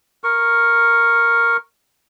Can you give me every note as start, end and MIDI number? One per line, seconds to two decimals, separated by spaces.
0.24 1.57 70
0.24 1.57 85